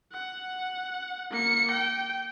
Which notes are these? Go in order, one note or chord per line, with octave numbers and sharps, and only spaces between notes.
F#5
A#3 C#7
G5